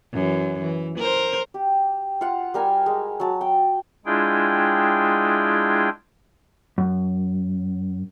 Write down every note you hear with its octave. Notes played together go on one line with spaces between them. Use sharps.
F#2 E3
E3
A#4 C5
G4
F4 F#5
G3 A#4 G#5 E6
G#3
F#3 A5
G5
G#3 D4 E4 F4 G#4 G5
F#2